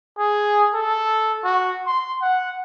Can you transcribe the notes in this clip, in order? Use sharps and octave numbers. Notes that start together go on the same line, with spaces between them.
G#4
A4
F#4
C6
F#5